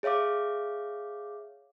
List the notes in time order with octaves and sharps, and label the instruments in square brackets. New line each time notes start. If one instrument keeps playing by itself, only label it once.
[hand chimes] G#4 C#5 E5 F5 D6